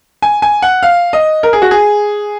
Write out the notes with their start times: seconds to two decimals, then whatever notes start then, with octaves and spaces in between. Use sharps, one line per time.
0.22 G#5
0.42 G#5
0.62 F#5
0.83 F5
1.13 D#5
1.43 A#4
1.53 G#4
1.62 F#4
1.71 G#4